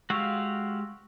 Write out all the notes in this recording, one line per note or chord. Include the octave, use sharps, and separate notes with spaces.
G#3 F#4 G4 F5 C#6 E6